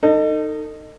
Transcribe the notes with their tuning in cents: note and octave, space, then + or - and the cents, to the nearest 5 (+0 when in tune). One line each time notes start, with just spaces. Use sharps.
D#4 -10 A4 +35